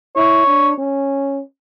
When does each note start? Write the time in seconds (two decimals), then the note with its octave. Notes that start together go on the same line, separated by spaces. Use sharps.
0.16 E4 C#5
0.47 D4
0.78 C#4